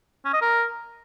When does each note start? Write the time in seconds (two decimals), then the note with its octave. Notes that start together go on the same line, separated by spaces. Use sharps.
0.25 C#4
0.33 D#5
0.41 A#4